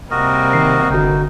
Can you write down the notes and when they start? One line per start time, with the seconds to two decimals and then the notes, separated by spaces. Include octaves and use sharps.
0.11 C3 G3 A#3 F#4 A#4 D#5
0.53 D#3 C7
0.90 G1 D3 D#4 F#4